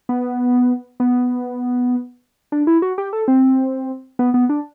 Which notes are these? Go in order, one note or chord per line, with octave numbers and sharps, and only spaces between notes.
B3
B3
D4
E4
F#4
G4
A4
C4
B3
B3
D4